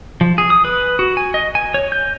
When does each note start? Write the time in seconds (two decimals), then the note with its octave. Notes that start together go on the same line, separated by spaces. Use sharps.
0.21 F3
0.38 G#4
0.50 D#6
0.65 B4
0.99 F#4
1.17 G#5
1.34 D#5
1.55 G#5
1.74 C#5
1.92 G6